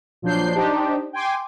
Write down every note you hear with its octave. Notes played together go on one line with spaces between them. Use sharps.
A#2 F3 F#3 D4 G6 C7
D4 D#4 G4 C5
G5 G#5 C6 D6